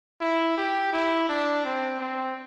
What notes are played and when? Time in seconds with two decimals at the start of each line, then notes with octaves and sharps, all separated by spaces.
0.21 E4
0.58 G4
0.93 E4
1.29 D4
1.65 C4
2.00 C4